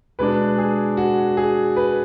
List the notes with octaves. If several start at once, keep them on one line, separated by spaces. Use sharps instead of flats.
B2 G#3 D4 B4
G#4
F#4
G#4
B4